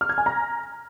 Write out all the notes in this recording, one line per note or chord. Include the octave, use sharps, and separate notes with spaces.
F6
G#6
G#5
A#5